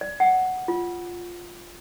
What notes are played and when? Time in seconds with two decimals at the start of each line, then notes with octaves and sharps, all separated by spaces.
0.01 D5
0.20 F#5
0.68 F4